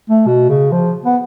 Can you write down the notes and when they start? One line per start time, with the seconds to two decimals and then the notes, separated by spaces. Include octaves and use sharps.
0.09 A3
0.27 B2
0.49 C#3
0.72 F3
1.05 B3